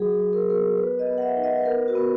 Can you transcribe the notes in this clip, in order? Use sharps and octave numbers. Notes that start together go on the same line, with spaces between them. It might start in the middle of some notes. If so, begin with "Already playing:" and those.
Already playing: F#3 F#4 G#4
F#3
A#4
G#4
B3 A#4
B3 B4
D#5
B3
F#5
E5
D#4
D#5
B4
B3 A#4
F#4
B3